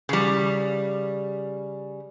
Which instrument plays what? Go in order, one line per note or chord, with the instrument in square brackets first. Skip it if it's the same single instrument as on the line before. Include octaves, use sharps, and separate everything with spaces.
[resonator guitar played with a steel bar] C#3 G3